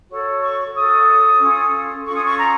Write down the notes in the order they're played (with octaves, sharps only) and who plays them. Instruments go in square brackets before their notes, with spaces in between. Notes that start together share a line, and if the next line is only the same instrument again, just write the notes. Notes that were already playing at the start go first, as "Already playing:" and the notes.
[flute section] F#4 A4 C#5
C#6
F#4 A4 C#5 D#6
C#4 F4 A4
C#4 F4 A4 C#6
D#6
C#6
A#5